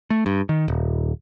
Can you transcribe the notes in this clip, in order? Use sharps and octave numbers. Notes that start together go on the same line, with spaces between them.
A3
G2
D#3
D#1